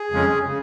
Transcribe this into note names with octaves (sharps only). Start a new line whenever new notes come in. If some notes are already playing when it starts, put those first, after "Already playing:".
Already playing: G#4
F2 C#3 G#3 C#4
C#3